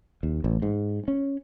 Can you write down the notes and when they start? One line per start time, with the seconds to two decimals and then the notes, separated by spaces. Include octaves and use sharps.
0.23 D#2
0.44 A1
0.62 G#2
1.08 C#4